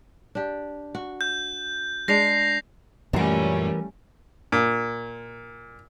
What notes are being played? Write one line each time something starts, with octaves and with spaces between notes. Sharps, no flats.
D4 G4
F#4
G6
G#3 D4 A#6 C7 F7
F#2 A#2 E3 G3 A3 C#4 A#4
A#2